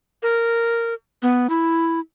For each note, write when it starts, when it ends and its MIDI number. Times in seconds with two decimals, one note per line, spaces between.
0.23 0.94 70
1.22 1.47 59
1.50 1.99 64